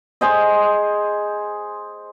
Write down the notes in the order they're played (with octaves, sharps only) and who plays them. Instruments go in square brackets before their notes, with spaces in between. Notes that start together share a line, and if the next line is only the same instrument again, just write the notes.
[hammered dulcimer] G#4 C5 D#5